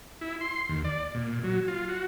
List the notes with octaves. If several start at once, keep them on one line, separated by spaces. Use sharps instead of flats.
E4
C6
D#2
D5
A#2
F#3
F4
F#4